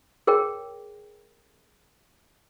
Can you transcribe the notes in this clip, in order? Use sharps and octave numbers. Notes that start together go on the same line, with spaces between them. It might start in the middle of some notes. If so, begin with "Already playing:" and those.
G#4 A#4 C#5 G5